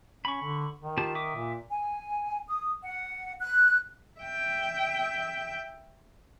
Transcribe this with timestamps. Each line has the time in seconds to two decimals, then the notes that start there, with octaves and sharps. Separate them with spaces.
0.25 C#4 B5 C#6
0.42 D3
0.81 D#3
0.98 F4 G4 A5
1.15 E5 D6 D#6
1.35 A#2
1.70 G#5
2.48 D#6
2.83 F#5
3.41 F#6
4.20 E5 G5